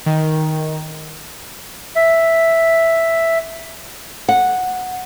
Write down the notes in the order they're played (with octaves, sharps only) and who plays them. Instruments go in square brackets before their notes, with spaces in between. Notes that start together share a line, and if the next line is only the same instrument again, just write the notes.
[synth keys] D#3
[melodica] E5
[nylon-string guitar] F#5